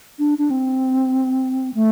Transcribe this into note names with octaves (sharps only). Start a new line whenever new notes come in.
D4
D4
C4
A3